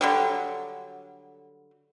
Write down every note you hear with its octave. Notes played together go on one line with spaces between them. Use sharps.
D3 F#3 G3